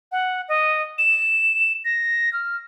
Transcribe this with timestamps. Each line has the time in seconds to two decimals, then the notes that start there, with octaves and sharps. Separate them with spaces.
0.12 F#5
0.48 D#5
0.98 E7
1.85 A#6
2.33 F6